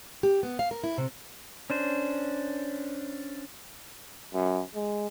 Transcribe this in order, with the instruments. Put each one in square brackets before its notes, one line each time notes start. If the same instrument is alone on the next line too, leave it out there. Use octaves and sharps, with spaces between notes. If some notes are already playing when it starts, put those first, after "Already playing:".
[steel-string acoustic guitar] G4
B3
F5
A#4
E4
C3
[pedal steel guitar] C#4 D4 C5
[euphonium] F#2
G#3